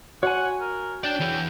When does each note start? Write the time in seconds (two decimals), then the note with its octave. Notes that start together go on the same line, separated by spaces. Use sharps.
0.23 F#4 C#5 F#5 G#5
0.61 A#4
1.04 D4 D5 G5
1.20 E3 G#4